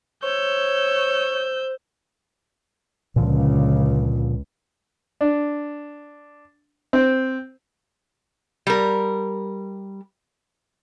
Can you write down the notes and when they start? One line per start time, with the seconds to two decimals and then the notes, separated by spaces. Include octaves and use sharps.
0.23 C5 C#5 E6 G6
3.16 C#2 A#2 D3 F3
5.21 D4
6.93 C4
8.67 G3 A#4